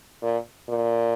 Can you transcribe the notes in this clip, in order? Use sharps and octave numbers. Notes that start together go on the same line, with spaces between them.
A#2
A#2